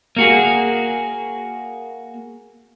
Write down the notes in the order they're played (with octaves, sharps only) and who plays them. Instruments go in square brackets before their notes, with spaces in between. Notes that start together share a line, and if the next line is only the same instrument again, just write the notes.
[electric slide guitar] A#3 F#4 G#4